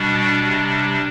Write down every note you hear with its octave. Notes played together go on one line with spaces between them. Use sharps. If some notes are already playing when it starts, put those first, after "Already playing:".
Already playing: B2 G3 D4
C3 G3